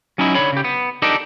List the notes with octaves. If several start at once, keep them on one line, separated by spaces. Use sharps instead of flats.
F#3 C#4 D#4 E4
D3 C#5 B5
C#3 G4
B3
D4 D#4 G4 A4 A#4 D5